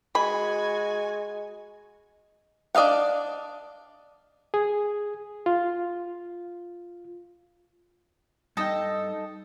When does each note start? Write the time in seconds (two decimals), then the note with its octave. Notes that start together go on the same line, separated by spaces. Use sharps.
0.15 G#3 F#4 G#5 B5
2.75 D4 D5 D#5 F5 F#5
4.54 G#4
5.46 F4
8.57 G2 D#4 A4 D#5 G5